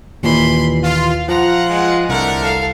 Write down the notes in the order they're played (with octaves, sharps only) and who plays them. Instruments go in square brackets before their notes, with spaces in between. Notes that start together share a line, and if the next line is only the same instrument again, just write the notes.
[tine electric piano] D#2 A#2 E3 [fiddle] B5 C6
[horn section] F4 [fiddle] F5
[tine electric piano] F3 [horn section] F4 F#5 [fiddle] A#5
[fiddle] G#3
[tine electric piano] C2 [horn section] D3 A3 A#4 [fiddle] F#5
[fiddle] A4 F5